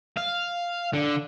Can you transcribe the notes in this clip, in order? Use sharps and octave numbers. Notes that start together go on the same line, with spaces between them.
F5
D3